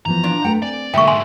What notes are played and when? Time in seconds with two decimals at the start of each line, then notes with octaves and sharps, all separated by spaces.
0.06 E3 F3 B3 A#5
0.24 A#2 D4
0.44 A3 A4 B4 F#5 G5
0.62 C4 D5 G#5
0.94 B1 D3 G#3 A#3 E5 G5 C#6
1.08 B1 G#2 G#5 C6